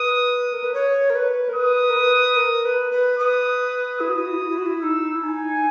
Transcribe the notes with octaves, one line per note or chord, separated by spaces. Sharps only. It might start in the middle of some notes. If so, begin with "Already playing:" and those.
Already playing: B4 D#6
A#4
B4
C#5
A#4
B4
A#4
B4 D#6
A#4
B4
A#4
B4
B4
B4 D#6
E4 D#6
F#4
E4
F#4
E4
F#4
E4
F#4
E4
D#4 E6
E4
D#4 G#5